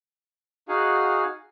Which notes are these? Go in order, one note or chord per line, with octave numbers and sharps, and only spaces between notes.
D#4 F#4 G#4 F5 F#5 G#5